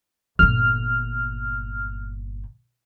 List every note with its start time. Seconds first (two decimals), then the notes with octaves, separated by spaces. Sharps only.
0.39 G1 A#2 F6